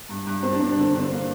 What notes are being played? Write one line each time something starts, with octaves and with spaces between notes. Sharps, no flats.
G2
G2
G2 C4
D4
G2 C4
D4
D3 C4
G2 D4
C4
A#3